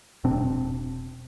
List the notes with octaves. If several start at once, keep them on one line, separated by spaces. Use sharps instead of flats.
E1 B2 C4 D4